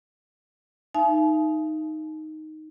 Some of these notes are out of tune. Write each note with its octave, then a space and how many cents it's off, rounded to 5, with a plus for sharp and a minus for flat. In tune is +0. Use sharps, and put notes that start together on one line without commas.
D#4 +0 E5 +45 G#5 +45